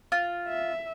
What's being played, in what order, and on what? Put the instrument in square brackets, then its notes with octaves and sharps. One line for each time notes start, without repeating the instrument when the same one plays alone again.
[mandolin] F4
[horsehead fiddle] E5